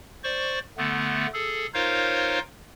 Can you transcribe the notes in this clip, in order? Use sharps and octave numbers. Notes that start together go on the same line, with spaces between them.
C5 D5 C#6
D3 A3 B3
G#4 A4
D#4 F4 A#4 C5 C#5 F5